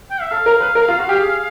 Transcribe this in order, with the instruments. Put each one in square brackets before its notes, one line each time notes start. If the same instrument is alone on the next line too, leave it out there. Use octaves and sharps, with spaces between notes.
[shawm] G5
E5
[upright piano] A4 [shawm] F5
[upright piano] A#4
B4
A#4
F4
F#4
G4
G#4